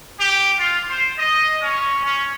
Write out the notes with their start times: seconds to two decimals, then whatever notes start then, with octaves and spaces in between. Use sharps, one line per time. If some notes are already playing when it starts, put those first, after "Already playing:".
0.19 G4
0.58 F4
0.88 C5
1.18 D#5
1.61 C#4
2.04 C#4